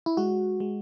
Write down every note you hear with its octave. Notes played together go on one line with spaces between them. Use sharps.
E4
G#3 F#4
G#3